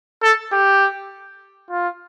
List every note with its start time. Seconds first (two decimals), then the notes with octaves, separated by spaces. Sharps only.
0.22 A4
0.52 G4
1.70 F4